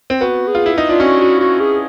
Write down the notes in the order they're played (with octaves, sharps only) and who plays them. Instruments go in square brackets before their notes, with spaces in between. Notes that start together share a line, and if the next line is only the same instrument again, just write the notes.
[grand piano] C4
[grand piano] B3 [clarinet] F#4
[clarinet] G#4
[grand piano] F4
E4
D#4
[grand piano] D4 [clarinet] F4
[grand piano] C#4 [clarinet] F#4
[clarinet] F#4
F#4
G#4